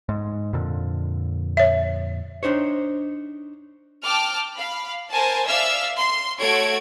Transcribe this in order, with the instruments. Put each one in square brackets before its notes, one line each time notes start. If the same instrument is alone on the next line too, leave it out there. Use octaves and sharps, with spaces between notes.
[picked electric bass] G#2
F2 A#2 D3
[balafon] C#5 E5
[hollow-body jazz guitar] D4 D#4 C5 C#5
[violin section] G5 A5 D6 F6
F5 B5
A#4 C5 G#5 A5
D5 E5 F5 E6 F6
C6
A3 F#4 A4 C#5 G#6 D7